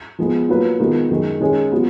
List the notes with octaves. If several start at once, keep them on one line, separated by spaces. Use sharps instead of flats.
F3 G#3 B3
F#3 A#3 F4 B4
D#3 G#3 B3 F4 A#4
F#2 D#3 G#3
D#3 G#3 C#4 G#4
F#3 B3 F4